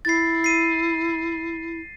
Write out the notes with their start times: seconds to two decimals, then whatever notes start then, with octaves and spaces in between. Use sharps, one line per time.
0.05 E4 A6 C7
0.44 C7 D#7